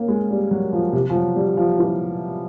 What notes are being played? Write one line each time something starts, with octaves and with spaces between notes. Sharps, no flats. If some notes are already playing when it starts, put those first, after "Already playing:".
Already playing: A#3 C#4
G#3
G3
F#3
F3
C3
F3
F#3
G3
F3
E3